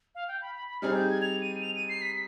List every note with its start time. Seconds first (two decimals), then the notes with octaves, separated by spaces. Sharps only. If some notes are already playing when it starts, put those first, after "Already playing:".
0.15 F5
0.28 G5
0.42 B5
0.55 B5
0.69 B5
0.82 G3 C4 D#4 G#4 F6
0.95 G6
1.09 G#6
1.22 F7
1.41 D#7
1.62 F7
1.76 D#7
1.89 C7
2.02 B6